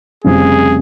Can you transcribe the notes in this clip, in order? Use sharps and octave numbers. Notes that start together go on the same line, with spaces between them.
F1 F2 C#3 G3 C4 G#4